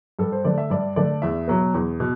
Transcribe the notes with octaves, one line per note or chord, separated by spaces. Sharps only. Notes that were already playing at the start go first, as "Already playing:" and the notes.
G2 A4
C5
D3 A3 D5
E5
G2 D5
D3 A3 D5
E2 E5
B2 F#3 B3
E2
B2